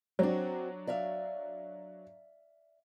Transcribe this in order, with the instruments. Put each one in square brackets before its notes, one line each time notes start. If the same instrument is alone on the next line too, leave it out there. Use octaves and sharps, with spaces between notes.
[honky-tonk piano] F#3 D4 [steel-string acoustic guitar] C4 F#4
[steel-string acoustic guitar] D5 E5 F5